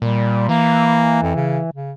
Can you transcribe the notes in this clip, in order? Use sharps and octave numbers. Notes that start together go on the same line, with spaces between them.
A#2 G3
E3 A#3
F2
C#3
C#3